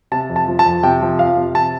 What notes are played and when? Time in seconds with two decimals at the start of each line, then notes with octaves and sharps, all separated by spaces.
0.12 C3 A5
0.29 F2
0.36 A5
0.48 F3
0.59 A5
0.65 F2
0.83 C3 G5
1.01 F3
1.19 F2 F5
1.37 C3
1.55 A5